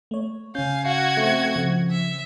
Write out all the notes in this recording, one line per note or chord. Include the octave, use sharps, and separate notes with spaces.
A3 C#5
C#3 C#4 F5 G#5 G6
F#4 F5 G#6
A3 C4
C#3 F3
E5